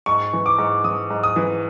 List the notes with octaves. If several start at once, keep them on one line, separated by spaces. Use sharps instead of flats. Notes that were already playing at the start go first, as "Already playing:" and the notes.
G#2 C#6
E3
D6
G#2
E3 D#6
G#2
D#6
E3